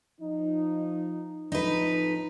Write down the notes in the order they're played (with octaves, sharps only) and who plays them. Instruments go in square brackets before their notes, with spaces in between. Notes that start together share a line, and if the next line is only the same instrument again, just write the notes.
[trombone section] F3 D#4
[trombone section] F2 A2 F3 [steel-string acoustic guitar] D#4 B4